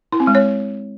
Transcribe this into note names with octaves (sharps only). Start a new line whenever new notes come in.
E4
C4
G#3
C#5